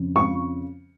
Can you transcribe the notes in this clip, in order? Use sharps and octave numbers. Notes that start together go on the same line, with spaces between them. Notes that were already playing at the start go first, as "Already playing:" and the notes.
Already playing: F2 C#3
C#6